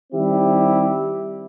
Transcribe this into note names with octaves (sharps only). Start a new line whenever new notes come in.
D#3 G3 C4 E4 G4